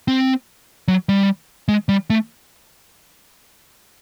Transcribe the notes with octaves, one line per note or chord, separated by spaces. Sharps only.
C4
F#3
G3
G#3
G3
A3